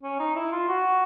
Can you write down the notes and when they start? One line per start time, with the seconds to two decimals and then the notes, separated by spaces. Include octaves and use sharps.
0.03 C#4
0.19 D#4
0.36 E4
0.52 F4
0.68 F#4